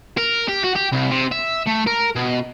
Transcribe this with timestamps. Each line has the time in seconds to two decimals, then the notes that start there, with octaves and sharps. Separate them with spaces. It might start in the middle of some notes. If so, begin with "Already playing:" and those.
0.17 A#4
0.48 G4
0.64 F#4
0.75 G4
0.92 C2
1.11 C3
1.32 E5
1.67 A3
1.87 A#4
2.16 B2